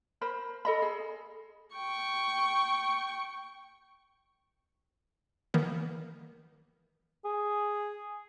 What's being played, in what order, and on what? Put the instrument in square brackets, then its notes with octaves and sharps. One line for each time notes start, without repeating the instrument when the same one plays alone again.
[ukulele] A#4 C5 B5
A4 D#5 B5
G#4
[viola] G5 C#6
[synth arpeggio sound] D#3 E3 A#3 B3
[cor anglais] G#4